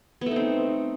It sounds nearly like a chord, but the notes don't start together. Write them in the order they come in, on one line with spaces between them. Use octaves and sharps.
B3 A3 D#4 C4